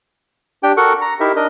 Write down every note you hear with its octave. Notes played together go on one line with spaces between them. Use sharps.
D4 G4 G5
F#4 A4 A#4 F#5 C#6
A#5
D#4 E4 G4 A#4 E5
D4 A#4 D#5